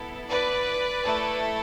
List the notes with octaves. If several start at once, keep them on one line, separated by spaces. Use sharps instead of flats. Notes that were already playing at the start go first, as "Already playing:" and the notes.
Already playing: B3 E4 A4
B4 D5
A3 E4 A4